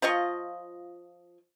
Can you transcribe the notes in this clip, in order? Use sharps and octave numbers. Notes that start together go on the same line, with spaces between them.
F3 F4 D#5 C#6